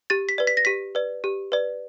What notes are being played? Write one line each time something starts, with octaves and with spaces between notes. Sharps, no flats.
G4 A6
B6
B4 D5
B6
A#6
G4 B6
B4 D5
G4
B4 D5